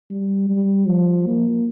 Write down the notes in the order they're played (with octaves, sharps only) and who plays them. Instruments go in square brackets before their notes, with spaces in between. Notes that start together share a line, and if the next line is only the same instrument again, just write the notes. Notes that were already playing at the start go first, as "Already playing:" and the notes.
[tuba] G3
G3
F3
A#3